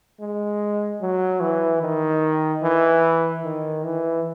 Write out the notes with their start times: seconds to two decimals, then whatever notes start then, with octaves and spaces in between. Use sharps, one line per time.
0.20 G#3
1.01 F#3
1.41 E3
1.82 D#3
2.63 E3
3.44 D#3
3.84 E3